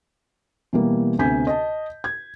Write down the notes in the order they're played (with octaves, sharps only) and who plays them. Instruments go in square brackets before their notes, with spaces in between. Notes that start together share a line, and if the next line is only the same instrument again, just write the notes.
[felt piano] B2 E3 G3 A#3
D2 C3 B3 G#5 G6 B6
D#5 A5
G#6